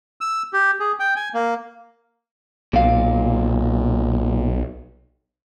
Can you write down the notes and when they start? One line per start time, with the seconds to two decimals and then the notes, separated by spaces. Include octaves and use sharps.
0.21 E6
0.53 G4
0.80 G#4
0.99 G5
1.16 G#5
1.34 A#3
2.73 B1 A#2 F5